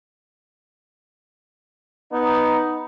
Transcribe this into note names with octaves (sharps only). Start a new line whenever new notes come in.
B3 D#4